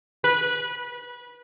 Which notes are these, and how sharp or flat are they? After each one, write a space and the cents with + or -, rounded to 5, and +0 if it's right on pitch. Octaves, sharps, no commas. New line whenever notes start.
B4 -25